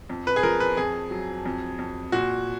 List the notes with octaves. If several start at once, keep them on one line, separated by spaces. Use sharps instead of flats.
F2
B4
G#4
F3 A#4
B4
F2 G#4
F#3
F2
F2
A#2 F#4